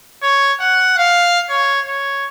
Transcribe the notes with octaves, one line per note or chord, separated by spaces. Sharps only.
C#5
F#5
F5
C#5
C#5